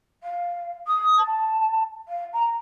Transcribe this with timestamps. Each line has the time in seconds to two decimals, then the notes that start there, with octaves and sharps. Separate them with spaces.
0.23 F5
0.87 D#6
1.18 A5
2.08 F5
2.33 A#5